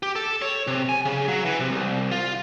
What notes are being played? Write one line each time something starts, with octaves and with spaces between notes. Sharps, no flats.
G4
A4
C#5
C3
G#5
C#3
F#3
E3
C3
C2
F4